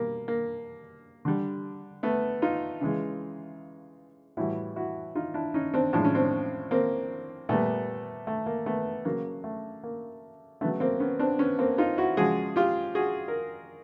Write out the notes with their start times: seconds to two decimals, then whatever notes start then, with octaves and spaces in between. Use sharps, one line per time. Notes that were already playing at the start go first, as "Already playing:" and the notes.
Already playing: B2 G3 A#3
0.28 A#3
1.25 D3 G3
2.03 A3 B3
2.42 D#4 F4
2.81 C#3 E3 G#3
4.37 A2 E3 G3 E4 F#4
4.76 E4 F#4
5.15 D#4 F4
5.34 D4 E4
5.54 C#4 D#4
5.74 C4 D4
5.93 A2 F3 G#3 D4
6.05 C#4
6.15 C4 D4
6.71 A#3 C4
7.49 A#2 G3 A3 B3
8.27 A3
8.46 A#3
8.66 A3 B3
9.05 C#3 F#3 A#3
9.44 A3
9.84 A#3
10.61 C#3 F#3 A3 B3
10.80 A#3 C4
11.00 B3 C#4
11.19 C4 D4
11.39 B3 C#4
11.59 A#3 C4
11.78 D#4 F4
11.97 E4 F#4
12.17 C#3 F3 G#3 F#4 G#4
12.56 F4 G4
12.95 F#4 G#4
13.28 A#4